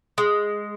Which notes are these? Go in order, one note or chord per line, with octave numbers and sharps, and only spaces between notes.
G#3